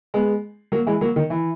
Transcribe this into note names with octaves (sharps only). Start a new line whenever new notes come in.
G#3 B3
F#3 A#3
E3 G#3
F#3 A#3
D#3
E3